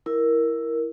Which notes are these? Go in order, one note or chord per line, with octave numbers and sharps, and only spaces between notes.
E4 A#4